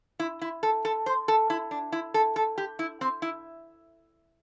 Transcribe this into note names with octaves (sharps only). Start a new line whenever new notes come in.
E4
E4
A4
A4
C5
A4
E4
D4
E4
A4
A4
G4
E4
C4
E4